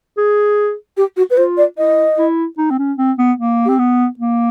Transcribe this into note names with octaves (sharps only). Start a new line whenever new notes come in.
G#4
G4
F#4
B4
F4 C5
D5
E4 D#5
E4
D#4
C4
C#4
C4
B3
A#3
G4
C4
B3
A#3